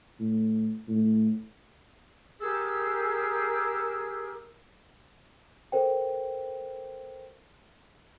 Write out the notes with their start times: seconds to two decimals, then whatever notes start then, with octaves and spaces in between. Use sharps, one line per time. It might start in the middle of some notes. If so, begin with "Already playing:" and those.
0.20 A2
0.88 A2
2.41 G4 G#4 A#4 E6
5.72 A4 A#4 C5 G5